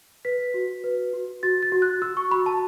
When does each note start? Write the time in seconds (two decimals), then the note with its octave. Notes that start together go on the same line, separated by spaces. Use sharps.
0.25 B4 B6
0.54 F#4
0.84 B4
1.13 F#4
1.43 F#4 A6
1.63 A6
1.72 F#4
1.82 F#6
2.02 F#4 E6
2.17 C#6
2.31 F#4 B5
2.46 A5